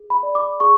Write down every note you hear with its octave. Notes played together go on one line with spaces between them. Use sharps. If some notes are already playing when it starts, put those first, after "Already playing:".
Already playing: G#4
B5
D5
D6
G#4 C#6